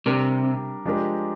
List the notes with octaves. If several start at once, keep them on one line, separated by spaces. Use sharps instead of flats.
C3 G3 D4 G4 A#4
F3 G#3 D4 G4 A#4